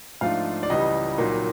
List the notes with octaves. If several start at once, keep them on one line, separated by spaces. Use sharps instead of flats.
G#2 F3 A3 D4 F4 F5
D5
C#2 C#3 E3 G3 D#5
C2 A#2 F#3 A#3 D#4